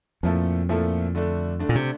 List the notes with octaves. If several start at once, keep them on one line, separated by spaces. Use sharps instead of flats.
F2 A#2 F3 A3 E4 A4
A#2 F3 A3 E4 A4
D3 A3 D4
D3 A3 D4
A#2
C3